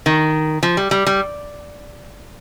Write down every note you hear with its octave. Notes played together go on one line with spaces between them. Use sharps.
D#3
F3
G3
G3
G3